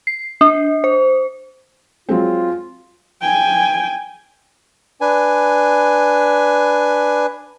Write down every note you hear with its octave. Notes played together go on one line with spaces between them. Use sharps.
C7
D4
C5
F#3 G#3 C4 F4
G5 G#5
D4 B4 G#5